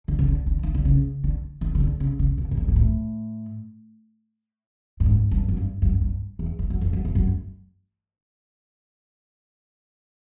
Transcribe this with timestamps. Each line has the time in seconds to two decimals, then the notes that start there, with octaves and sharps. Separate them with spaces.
0.08 D3
0.19 C#3
0.28 D3
0.46 D3
0.63 D#3
0.74 D3
0.85 C#3
1.24 D3
1.61 D#3
1.75 C#3
1.80 D3
2.00 C#3
2.19 C#3
2.38 B2
2.51 B2
2.57 A#2
2.68 A#2
2.76 A2
5.00 G2
5.06 G#2
5.31 G2
5.48 F#2
5.57 G2
5.82 F#2
6.01 G2
6.39 E2
6.59 F2
6.70 F#2
6.81 F2
6.93 F#2
7.05 F2
7.15 F#2